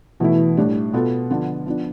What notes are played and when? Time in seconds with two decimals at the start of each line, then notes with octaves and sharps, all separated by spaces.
0.20 B2 E3 A3 E4
0.57 A2 G3 D4
0.93 B2 B3 F4 A4
1.30 D3 F3 B3 F4
1.66 F3 B3 D4